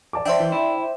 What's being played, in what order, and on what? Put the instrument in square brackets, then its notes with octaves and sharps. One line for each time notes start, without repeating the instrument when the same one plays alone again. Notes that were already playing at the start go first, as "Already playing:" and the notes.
[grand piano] D5 A5 D6
[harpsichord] D4 [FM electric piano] C5 E5 G5
[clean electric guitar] E3
E4